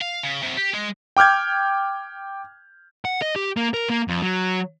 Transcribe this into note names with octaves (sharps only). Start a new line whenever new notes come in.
F5
C#3
C3 F#3
G4
G#3
G5 D6 F6 G6 G#6
F#5
D#5
G4
A#3
A#4
A#3
F2
F#3